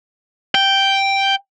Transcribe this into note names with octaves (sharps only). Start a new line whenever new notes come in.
G5